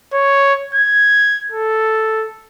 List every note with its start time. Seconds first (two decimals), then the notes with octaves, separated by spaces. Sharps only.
0.13 C#5
0.75 G#6
1.52 A4